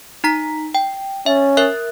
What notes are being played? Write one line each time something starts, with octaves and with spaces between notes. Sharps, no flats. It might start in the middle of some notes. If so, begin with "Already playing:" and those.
D#4 A#5 B6
G5
C#4 E5
A#4 E5 F#6